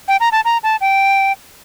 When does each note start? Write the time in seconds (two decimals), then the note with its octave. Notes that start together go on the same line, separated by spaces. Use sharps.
0.08 G5
0.20 A#5
0.32 A5
0.45 A#5
0.63 A5
0.81 G5